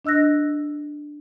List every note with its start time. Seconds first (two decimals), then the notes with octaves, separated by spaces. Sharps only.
0.05 D4 D#5 E6 F#6 A#6